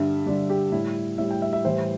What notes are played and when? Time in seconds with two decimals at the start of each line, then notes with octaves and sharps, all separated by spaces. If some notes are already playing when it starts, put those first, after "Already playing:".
Already playing: G2 D3 G3 E5
0.26 G2 D3 G3 D5
0.50 G4
0.72 A2 G3 E4
1.18 A2 E5
1.21 G3
1.31 G5
1.42 E5
1.53 E5
1.64 A2 E3 G3 C5